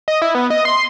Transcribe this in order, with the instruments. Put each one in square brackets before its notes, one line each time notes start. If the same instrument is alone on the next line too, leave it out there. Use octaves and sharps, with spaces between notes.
[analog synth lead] D#5
E4
B3
D#5
C6